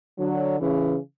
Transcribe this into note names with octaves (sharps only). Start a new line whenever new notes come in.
D3 F#3
C#3 E3